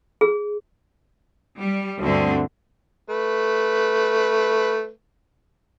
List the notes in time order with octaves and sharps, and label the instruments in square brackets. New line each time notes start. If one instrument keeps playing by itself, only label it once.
[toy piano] G#4
[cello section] G3
D2 G2 D3 C4
[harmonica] A3 B4